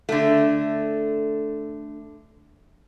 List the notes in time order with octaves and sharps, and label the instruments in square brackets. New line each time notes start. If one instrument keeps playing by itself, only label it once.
[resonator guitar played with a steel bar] D3 A3